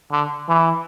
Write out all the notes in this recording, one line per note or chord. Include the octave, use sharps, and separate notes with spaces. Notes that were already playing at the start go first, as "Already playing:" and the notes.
D3
E3